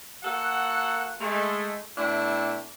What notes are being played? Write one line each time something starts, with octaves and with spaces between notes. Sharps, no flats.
A#3 F#4 A4 F#5
G#3 A3
B2 A3 D4 E4 G5